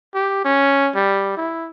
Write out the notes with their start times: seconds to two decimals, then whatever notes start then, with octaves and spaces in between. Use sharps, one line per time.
0.14 G4
0.45 C#4
0.95 G3
1.37 E4